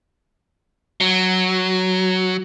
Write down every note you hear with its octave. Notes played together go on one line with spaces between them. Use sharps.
F#3